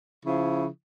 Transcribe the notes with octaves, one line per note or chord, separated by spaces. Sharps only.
C#3 F3 E4